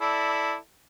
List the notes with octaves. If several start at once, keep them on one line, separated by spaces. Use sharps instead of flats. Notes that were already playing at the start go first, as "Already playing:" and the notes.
E4 A4 D5